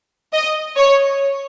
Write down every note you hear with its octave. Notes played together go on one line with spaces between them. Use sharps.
D#5
C#5